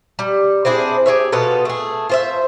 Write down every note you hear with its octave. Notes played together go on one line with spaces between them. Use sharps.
G3
C4 D4 E4 G#4
G4 G#4 C#5 E5
B2 B3 F4 A4
A3 G#4
F4 C5 E5